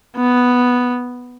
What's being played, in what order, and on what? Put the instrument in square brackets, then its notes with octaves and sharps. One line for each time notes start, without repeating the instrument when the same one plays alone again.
[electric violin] B3